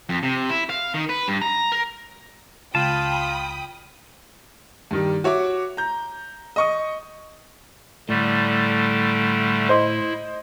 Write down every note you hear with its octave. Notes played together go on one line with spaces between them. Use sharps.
F2
C3
E4
F5
D#3
B4
G2
A#5
A#4
C#2 F4 G5 A5 B5 D#6
G2 D#3 G3
F#4 C#5 E5 D6
A#5 G6
D#5 C#6 D#6
A2 D3 G3 A3
E4 C5 D#5 C6